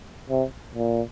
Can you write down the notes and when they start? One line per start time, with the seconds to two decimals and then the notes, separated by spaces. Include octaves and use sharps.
0.30 C3
0.75 A#2